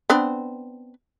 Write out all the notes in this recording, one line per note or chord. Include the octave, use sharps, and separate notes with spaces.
B3 C4 D4